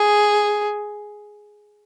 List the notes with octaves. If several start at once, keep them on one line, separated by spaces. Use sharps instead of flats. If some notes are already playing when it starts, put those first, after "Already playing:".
Already playing: G#4